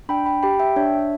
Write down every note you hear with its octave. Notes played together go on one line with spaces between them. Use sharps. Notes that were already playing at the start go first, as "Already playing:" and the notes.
D4 G5 B5
G5 B5
G4 G5 B5
E5 G5
D4 C#5 E5